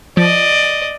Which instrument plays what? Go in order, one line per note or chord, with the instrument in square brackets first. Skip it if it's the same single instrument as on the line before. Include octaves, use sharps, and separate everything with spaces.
[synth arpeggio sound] F3 [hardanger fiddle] D5 D#5